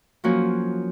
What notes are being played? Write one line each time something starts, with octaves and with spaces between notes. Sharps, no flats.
F3 F#3 A#3 C#4 F#4